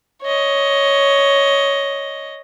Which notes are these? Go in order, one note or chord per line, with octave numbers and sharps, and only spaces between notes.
C#5 D#5